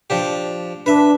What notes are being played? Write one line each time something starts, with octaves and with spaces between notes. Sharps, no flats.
F3 D4 G4
D4 B4 E5